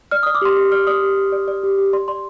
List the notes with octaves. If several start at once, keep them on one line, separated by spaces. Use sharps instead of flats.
D5 F6
D#6
D5
D6
G4 C6
G4
D5 F6
D5 D#6
G4
G4
D5
D5
G4
G4
D5 C6
D5 C6